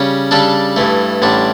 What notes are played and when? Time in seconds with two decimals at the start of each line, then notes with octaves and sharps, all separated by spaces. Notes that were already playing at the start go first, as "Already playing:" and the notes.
Already playing: C#3 G3 C#4
0.31 C#3 G3 D4 A4
0.76 G2 E3 A3
1.22 A1 A2 G3 D4